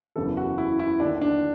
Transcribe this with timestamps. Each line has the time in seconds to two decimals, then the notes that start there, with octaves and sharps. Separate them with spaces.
0.16 F#1 E2 C#3 E3 A4
0.37 F#4
0.58 E4
0.79 E4
1.00 D#2 D4
1.03 D3
1.22 D4